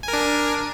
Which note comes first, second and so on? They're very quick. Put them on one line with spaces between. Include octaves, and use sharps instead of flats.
G#5 A#4 D4